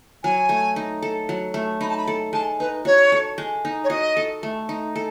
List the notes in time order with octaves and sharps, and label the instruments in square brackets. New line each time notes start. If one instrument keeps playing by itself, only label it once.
[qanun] F#3 [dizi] G#5
[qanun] A3
D#4
A4
F#3
A3
[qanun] D#4 [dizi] B5
[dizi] A5
B5
[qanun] A4
[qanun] G#3 [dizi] A5
[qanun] D#4 [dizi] B4
[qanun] F#4 [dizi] C#5
[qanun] A4
G#3
D#4
[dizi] C#5
[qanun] F#4 [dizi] D#5
[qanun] A4
A3
D#4
A4